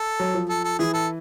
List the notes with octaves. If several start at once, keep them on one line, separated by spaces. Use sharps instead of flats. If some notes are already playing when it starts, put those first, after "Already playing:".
Already playing: A4
F#3
F3
A4
A4
E3 G#4
A4